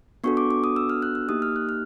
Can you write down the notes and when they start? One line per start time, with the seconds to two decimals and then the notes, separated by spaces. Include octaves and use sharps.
0.24 B3 D4 F#4 A4 C#6
0.37 D6
0.51 D6
0.64 D#6
0.76 E6
0.90 F6
1.02 F#6
1.15 E6
1.28 A#3 D#4 G4 D#6
1.42 F6
1.56 F#6
1.69 F6